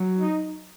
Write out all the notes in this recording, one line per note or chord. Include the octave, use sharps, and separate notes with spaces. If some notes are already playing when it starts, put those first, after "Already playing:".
Already playing: F#3
D#4